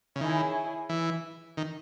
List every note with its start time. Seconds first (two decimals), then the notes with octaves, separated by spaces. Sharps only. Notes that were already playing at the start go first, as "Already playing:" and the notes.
0.16 C#3
0.21 D#3 E4 G#4 C#5 G#5
0.89 E3
1.57 D#3